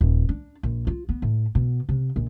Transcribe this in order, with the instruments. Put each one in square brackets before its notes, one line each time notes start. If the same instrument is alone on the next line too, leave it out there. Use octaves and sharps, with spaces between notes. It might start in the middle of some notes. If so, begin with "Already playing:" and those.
[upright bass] D#1
D4
A#1
F4
B3
A2
B2
C3
A#1